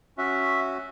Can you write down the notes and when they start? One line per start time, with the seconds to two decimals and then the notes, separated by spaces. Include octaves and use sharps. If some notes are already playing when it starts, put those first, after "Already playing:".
0.18 C#4 F#4 E5